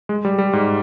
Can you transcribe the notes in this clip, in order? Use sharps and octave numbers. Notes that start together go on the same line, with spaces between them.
G#3
G3
G3
G#2